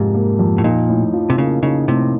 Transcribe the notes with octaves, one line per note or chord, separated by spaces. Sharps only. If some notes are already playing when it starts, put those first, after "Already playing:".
Already playing: F2 G#2 C3 F3 A#3
A#3
F2
A2
A#2 D#4
A2
F3
C3
C#3 A#3
C#3 D#4
A2 C3